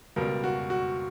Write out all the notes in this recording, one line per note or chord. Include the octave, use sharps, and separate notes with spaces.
C#2 B2 G3 A#4
F#4
F#4